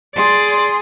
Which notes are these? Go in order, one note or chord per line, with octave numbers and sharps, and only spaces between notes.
G#4 D5 C6